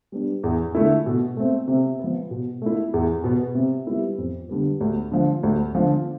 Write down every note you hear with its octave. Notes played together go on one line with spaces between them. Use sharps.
G3 B3 D4
E2
D3 A3 E4
B2
A3 C4
C3
F3 B3
B2
A3 E4
E2
B2 B3
C3
G3 B3 E4
F2
D3 G3 B3
D2
D3 F3
D2
D3 F3